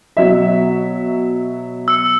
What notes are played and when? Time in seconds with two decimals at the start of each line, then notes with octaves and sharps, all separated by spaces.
0.17 B2 F#3 E5
1.88 E6 C#7